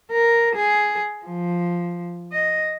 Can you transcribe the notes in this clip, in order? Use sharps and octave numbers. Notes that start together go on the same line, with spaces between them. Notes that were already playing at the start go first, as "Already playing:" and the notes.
A#4
G#4
F3
D#5